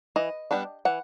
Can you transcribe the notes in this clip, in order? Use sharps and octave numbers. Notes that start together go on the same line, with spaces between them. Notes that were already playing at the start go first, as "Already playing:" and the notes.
E3 D#5
G3 B3 D4
E3 F#5